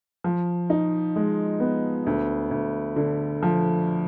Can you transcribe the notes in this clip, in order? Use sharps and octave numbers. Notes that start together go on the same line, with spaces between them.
F3
D#4
G#3
B3
D2
D2
D3
F3